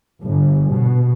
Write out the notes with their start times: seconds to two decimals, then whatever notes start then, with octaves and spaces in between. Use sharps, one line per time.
0.22 G1
0.72 B2